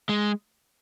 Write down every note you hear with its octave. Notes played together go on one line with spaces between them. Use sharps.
G#3